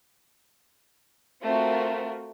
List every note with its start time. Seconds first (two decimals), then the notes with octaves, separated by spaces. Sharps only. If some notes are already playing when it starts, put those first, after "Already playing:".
1.43 A3 C4 F4 F#4 A#4